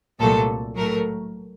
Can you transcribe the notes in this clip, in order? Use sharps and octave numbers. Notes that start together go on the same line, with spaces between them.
C2 A#2 F#3 A3 A4
A2 F#3 A3 A#4